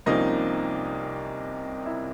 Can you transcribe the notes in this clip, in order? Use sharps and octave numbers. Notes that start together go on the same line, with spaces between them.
C2 C3 F3 A#3 C#4 D#4 D#5
E4 E5